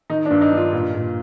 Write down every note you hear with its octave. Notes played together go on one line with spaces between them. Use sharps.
D#3 D#4
D4
G2
D#4
G2 F4
A#2
A#2